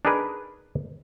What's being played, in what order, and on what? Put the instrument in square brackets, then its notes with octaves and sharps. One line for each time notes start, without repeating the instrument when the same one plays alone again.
[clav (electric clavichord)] D4 D#4 G#4 A#4 B4